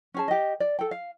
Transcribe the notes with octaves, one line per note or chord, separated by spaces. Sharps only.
C#4 G#4 A5
G4 D#5
D5
A4 G5
F5